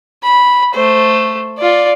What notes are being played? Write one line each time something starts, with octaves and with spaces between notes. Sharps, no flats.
B5
A3 C5
F4 D5